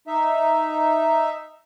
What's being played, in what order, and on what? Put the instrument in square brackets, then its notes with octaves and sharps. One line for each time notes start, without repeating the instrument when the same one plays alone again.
[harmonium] D#4 E5